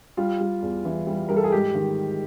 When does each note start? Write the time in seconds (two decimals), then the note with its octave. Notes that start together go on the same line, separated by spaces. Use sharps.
0.17 G3 F4
0.40 G3
0.62 E2
0.85 E3
1.07 G3
1.29 G3 A#4
1.37 A4
1.44 G#4
1.52 G#2 G4
1.75 D#3